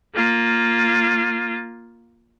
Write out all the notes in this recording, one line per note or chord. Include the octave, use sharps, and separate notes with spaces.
A#3 F4